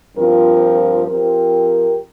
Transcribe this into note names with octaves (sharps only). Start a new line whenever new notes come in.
G2 F3 C4 F4 A#4
F3 C4 G4 A#4